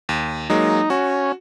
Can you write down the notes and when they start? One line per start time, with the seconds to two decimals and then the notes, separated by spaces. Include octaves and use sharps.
0.09 D#2
0.50 F#3 G#3 A#3 D#4
0.90 C#4 F#4